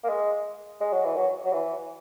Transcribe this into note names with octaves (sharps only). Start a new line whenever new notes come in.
A#3
G#3
G#3
F#3
E3
F#3
F#3
E3